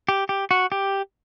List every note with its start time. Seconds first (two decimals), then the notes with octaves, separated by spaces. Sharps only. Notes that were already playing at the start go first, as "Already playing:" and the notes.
0.09 G4
0.29 G4
0.51 F#4
0.72 G4